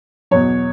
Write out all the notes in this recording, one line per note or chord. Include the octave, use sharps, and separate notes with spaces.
E2 B2 F#3 C#5